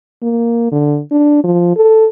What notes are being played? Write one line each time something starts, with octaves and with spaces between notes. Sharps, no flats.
A#3
D3
D4
F3
A4